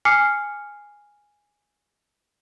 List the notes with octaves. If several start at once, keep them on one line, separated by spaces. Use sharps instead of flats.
G#5 D6 F6 C7 C#7